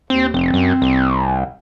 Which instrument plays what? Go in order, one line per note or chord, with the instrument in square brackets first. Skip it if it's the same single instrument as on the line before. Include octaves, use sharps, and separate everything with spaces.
[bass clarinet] D#2 [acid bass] C4
[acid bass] F1 [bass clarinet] C4
[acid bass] F#2
C2